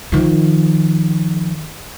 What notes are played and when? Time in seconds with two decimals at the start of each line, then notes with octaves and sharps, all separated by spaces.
0.12 D#3 F3